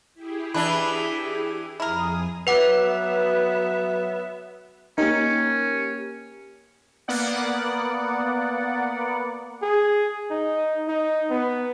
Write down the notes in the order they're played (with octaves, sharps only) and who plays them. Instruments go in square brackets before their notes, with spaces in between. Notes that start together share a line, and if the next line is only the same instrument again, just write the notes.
[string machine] E4 G4 G#4
[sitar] E3 D4 [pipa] B4
[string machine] F2 G#4 D#6 [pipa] E4 A#4
[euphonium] F#3 [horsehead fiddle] B3 E5 [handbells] B4 F#5 D6
[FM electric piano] A#3 G4 A#4 [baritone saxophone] C#4 [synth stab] D#4
[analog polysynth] A#3 B3 D5 F#5
[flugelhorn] G#4
D#4
D#4
B3